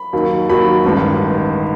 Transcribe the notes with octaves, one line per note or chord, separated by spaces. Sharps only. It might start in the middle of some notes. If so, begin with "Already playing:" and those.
Already playing: B5
D#2 D#3 F#3
D#2 D#3 F#3 B5
A1 G2 D#3 G#3